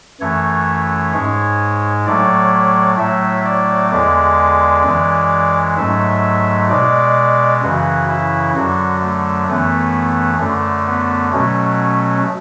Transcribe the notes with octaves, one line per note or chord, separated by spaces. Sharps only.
F#2 E3 A3 C#5
G#2 G#3
A2 F#3 A3 D5
A2 F#3 A3 E5
D5
E2 D3 G#3 D5
F#2 E3 G#3
G#2 F#3 A3 E5
B2 G#3 D5
F#2 C#3 E3 F#4
E4
F#2 D3 F#3 F#4
A3
F#2 E3 A3 B3
F#2 D3 A3
B3
B2 F#3 A3 C#4